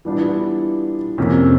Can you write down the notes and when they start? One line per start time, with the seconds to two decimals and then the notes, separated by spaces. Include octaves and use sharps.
0.05 E3 G3 B3 D4 F4
1.18 F2 C3 F3 A#3 C#4